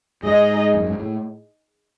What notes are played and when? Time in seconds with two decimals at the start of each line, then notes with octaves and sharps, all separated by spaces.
0.23 G#2 D#4 G#4 D#5
0.74 F#2
0.87 G#2
0.99 A2